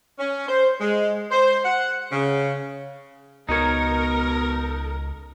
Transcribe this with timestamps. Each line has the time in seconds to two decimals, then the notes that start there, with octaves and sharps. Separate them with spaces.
0.19 C#4
0.48 C5
0.81 G#3
1.31 C5
1.64 F#5
2.12 C#3
3.49 C#2 B2 D#4 A#4 C#5